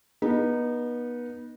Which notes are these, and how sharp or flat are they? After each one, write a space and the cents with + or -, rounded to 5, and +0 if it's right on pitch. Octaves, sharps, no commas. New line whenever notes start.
B3 -30 D#4 -15